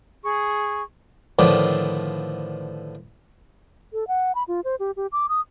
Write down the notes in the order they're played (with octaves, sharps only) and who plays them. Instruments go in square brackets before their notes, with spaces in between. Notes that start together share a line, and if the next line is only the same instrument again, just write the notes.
[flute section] G#4 C#6
[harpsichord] A2 D3 D#3 F3 B3 D5
[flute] A4
F#5
B5
F4
C5
G4
G4
D6
D#6